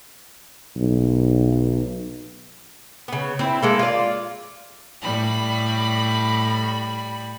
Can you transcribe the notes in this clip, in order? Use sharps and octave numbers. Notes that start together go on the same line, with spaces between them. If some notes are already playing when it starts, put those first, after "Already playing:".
B1
C#3 B3
C4 E4
G#3 A#3 A4
F4 D5
A2 G3 B5